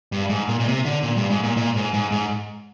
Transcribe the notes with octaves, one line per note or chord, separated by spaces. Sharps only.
G2
G#2
A#2
A#2
C3
D3
A#2
G2
G#2
A#2
A#2
G#2
G#2
G#2